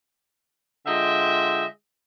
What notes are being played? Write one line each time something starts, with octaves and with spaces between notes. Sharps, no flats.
D3 G#3 F4 D#5 E5 G5